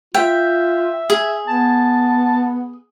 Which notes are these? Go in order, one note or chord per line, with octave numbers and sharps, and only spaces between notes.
F4 E5 G5
G#4
B3 A5